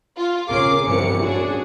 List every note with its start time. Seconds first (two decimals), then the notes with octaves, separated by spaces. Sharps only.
0.17 F4
0.49 C#3 C#4 G#4 A#4 D6 C7
0.87 G1 C2 E3 F3 C#7
1.22 C#4 D4 F#4 G#4